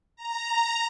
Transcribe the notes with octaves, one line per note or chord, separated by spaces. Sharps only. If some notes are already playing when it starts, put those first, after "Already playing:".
A#5